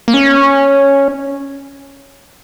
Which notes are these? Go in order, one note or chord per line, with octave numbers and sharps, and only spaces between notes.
A#3
C#4